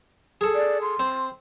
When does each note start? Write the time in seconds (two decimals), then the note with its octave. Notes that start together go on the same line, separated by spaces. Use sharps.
0.41 G#4 A4
0.55 D5
0.82 C6
1.00 C4